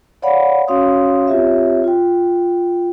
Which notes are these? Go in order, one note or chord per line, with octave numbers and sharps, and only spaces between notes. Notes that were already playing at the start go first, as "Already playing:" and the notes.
C#5 D5 F5 F#5 B5
C#4 F#4 C#5 F5 C6 D#6
C4 F4 G4 C#5 E5
F4 G5